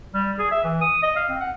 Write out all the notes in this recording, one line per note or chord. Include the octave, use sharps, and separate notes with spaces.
G3
G#4
E5
E3
D#6
D#5
F5
C4
F#5